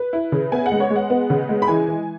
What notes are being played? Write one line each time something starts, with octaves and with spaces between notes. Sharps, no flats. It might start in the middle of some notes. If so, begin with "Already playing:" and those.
Already playing: B4
E4
C#3
B3 G#5
F#5
G#3
C#5
G#3
F#5
B3
C#3
G#3
B5
E3 G#5
E3